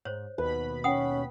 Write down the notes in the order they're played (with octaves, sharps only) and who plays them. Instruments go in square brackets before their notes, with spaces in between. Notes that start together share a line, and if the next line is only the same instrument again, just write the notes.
[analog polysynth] G#2 [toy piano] C5 C#5
[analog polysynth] D#2 B2 B5 [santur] B4
[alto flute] C#4 [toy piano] F#5 G5 D#6